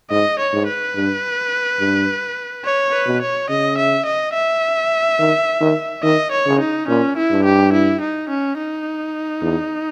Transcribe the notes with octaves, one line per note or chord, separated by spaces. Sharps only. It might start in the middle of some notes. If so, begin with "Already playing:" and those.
G#2 D#5
C#5
G#2
B4
G2
G2
C#5
B4
B2
C#5
C#3 D#5
E5
D#5
E5
D#3
D#3
D#3 D#5
C#5
C#3
D#4
A#2 C#4
E4
G2
G4
E4
D#4
C#4
D#4
E2